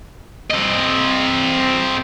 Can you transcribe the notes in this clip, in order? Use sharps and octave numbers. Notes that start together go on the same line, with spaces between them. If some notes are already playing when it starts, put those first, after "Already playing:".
C4 D#5